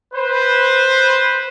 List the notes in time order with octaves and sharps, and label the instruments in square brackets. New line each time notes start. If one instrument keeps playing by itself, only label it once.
[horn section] B4 C5